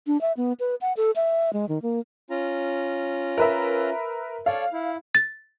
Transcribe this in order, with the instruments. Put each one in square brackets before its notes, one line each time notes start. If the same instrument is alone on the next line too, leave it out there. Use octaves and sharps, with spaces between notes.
[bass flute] D4
E5
B3
B4
F#5
A4
E5
G#3
D#3
A#3
[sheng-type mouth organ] C#4 F4 A#5
[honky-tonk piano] A#4 B4 E5
[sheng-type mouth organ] A4 C#5 D5 [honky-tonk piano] F5
[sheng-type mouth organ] E4
[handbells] A6